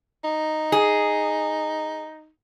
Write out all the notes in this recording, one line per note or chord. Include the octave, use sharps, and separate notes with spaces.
D#4
G#4